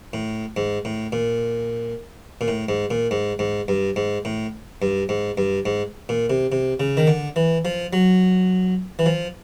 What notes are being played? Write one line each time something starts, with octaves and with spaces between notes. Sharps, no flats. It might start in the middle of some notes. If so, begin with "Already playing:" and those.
A2
G#2
A2
A#2
A#2
A2
G#2
A#2
G#2
G#2
G2
G#2
A2
G2
G#2
G2
G#2
A#2
C3
C3
C#3
D#3
D3
E3
F3
F#3
E3
F3